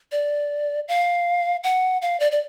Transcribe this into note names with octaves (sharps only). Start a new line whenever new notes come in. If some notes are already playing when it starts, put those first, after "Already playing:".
D5
F5
F#5
F5
D5
D5